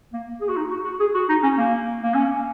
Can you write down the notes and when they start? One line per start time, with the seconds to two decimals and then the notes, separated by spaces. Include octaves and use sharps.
0.13 A#3
0.41 G#4
0.49 F#4
0.57 D#4
0.70 F#4
0.85 F#4
1.00 G#4
1.14 F#4
1.29 D#4
1.43 C#4
1.58 A#3
2.03 A#3
2.15 C#4